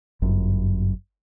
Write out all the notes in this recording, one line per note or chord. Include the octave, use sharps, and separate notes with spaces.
G1 F#2